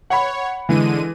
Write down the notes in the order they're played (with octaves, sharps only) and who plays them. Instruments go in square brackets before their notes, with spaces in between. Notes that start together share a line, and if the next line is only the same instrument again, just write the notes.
[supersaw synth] C#5 [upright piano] F#5 B5
[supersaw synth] D3 G#3 D#7 [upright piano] E3